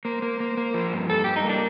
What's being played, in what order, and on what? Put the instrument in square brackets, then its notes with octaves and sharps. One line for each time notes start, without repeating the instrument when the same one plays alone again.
[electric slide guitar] A#3 [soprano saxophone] C5
[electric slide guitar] A#3
A#3
A#3
F3
G2
[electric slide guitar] G2 [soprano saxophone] A4
[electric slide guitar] G2 [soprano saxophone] G4
[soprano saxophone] D#4
[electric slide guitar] A#3 [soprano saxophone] D4